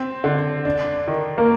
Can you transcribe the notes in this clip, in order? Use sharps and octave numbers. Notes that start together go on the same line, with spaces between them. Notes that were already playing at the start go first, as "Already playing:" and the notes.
Already playing: C4
D3
D4
D#3
A#3